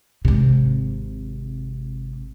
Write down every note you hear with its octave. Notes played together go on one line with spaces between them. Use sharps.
G#1 C3